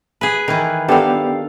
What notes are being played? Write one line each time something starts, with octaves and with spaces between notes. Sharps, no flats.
G#4 B4
D#3 E3
B3 D4 G4 A4 F5